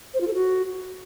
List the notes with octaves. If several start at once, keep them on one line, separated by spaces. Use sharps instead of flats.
C5
F4
A4
F#4